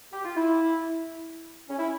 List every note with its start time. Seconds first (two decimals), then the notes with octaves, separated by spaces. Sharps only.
0.12 G4
0.25 F4
0.36 E4
1.69 C#4
1.78 E4